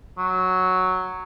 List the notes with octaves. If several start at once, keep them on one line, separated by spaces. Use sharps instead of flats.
F#3